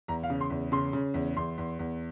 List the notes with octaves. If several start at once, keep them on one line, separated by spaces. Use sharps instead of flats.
E2 A#5
F5
C#3
C6
E2
C#3 C6
C#3
E2
E2 C6
E2
E2